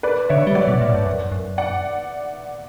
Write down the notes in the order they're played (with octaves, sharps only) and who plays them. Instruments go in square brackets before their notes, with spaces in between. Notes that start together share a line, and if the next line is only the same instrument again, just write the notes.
[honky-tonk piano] B4 D5
[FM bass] D3 [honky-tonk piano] C#5 E5
[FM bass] G3
[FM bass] F#3 [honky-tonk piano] D5 F#5
[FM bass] B2
A#2
G2
F#2
F#2
[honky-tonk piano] D5 F#5